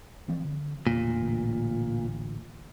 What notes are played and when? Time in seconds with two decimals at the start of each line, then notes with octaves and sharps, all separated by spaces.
0.28 E3 F3 C4
0.45 D3
0.87 E1 D2 A#2
1.20 A1 D2